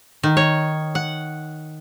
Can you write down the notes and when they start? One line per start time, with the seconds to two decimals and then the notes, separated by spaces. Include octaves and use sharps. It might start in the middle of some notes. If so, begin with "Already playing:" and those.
0.23 D#3
0.37 C#5
0.95 F#5